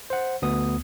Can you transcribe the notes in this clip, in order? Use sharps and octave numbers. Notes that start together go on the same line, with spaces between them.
C5 F#5
D2 B3 D#6